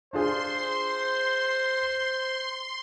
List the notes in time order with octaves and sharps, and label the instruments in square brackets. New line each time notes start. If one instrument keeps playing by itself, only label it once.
[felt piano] D4 F4 G#4 [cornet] C5 [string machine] C6